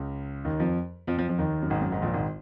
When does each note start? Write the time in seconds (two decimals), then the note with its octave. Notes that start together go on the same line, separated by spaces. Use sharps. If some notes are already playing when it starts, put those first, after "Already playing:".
Already playing: C#2 C#3
0.45 D#2 D#3
0.60 F2 F3
1.07 F2 F3
1.17 F2 F3
1.29 F2 F3
1.39 D#2 D#3
1.62 F#2
1.70 G#1 G#2
1.81 F#2
1.92 G#1 G#2
2.02 A#1 A#2
2.12 G#1 G#2